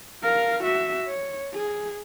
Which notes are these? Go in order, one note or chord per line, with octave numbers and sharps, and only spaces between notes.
A#4 F5
F#4 E5
C#5
G#4